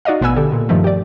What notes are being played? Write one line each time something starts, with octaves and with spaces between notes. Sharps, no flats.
D#4 F#4 D5 D#5 F5
A1 B2 B3 B4 G#5 E6
D3 G4 A4
A#2
G2 D#3 F3 A3
G4 D5